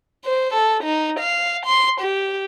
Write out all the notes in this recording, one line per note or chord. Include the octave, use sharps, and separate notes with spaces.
C5
A4
D#4
F5
C6
G4